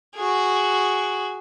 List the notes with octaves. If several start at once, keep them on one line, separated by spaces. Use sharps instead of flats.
F#4 G#4